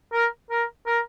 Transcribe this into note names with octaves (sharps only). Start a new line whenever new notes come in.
A#4
A#4
A#4